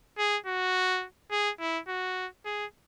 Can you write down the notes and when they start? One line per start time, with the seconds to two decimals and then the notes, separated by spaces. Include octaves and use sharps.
0.18 G#4
0.46 F#4
1.31 G#4
1.60 E4
1.88 F#4
2.46 G#4